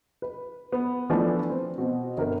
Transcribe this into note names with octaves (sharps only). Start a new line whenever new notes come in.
B4
B3
E3 F3 A3 B3 D4
C4
B2 C4 F#4
G1 A#4